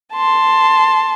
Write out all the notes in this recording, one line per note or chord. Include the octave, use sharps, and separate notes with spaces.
A5 C6